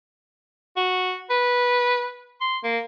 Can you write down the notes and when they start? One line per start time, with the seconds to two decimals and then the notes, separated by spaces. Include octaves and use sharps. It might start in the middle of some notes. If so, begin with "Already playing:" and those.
0.77 F#4
1.30 B4
2.41 C6
2.64 A#3